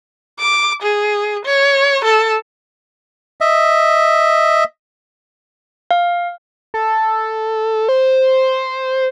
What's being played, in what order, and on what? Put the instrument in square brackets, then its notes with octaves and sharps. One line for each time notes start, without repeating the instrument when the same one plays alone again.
[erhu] D6
G#4
C#5
A4
[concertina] D#5 E5
[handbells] F5
[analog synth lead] A4
C5